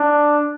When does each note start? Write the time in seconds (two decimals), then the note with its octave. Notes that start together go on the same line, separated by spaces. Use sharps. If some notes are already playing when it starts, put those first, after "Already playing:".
Already playing: D4